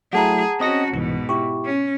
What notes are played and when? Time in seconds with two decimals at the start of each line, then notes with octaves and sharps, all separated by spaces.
0.13 F#3 A3 E4 G#4 F#5 A5 A#5
0.60 C4 C#4 F#4 D#5 A#6
0.93 C2 G#2 B2 E3
1.29 E4 G4 C#6
1.65 C#4